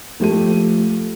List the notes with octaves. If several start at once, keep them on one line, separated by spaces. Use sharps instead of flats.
F3 A3 G4 A4 D#7